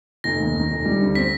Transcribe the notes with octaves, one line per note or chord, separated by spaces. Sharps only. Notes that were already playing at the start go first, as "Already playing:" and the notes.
F1 A#6
D#2
D#3
F1
G3
D2
C4 B6